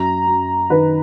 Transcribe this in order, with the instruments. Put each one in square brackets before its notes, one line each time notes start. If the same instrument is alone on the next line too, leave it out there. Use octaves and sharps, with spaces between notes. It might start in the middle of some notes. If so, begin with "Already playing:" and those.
Already playing: [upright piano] F#2 A#5
F#2
D#3 B4